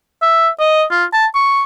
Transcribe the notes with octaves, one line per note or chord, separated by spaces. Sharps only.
E5
D#5
F4
A5
C#6